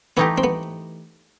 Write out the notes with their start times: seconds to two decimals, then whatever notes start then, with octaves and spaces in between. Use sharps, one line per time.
0.17 E3 A3 B3 D#4 G4
0.38 C4
0.44 B3